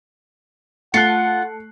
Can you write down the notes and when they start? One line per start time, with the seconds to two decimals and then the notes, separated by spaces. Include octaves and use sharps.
0.94 A3 F4 F#5 A5 F#6 C7 C#7